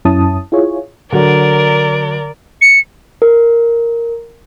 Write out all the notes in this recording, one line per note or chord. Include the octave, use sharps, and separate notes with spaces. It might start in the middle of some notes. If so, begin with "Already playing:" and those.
F#2 C#4 E4 A5 D#6
E4 F4 G#4 C#5
D3 F#3 A#4 D5
C#7
A#4